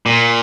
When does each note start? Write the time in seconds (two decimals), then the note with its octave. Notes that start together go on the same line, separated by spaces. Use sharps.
0.06 A#2